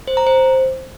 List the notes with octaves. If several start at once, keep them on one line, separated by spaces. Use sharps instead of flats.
C5
A#5
C5